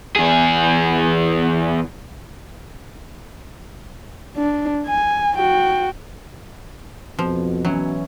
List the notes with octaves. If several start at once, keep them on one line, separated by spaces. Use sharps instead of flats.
E2 G#4
D4
G#5
F#4 G5
F2 B2 F3
E3 F#3 C#4